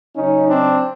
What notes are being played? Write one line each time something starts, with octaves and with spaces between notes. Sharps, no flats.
C#3 F#3 C#4 D#4
C4 D4